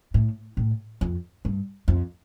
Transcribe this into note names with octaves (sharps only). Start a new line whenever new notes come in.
A2
A2
F2
G2
F2